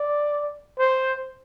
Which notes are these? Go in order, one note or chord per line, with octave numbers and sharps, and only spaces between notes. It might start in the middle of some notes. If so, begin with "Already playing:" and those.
Already playing: D5
C5